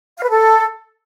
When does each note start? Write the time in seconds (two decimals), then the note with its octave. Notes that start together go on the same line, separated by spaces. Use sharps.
0.17 F5
0.23 B4
0.30 A4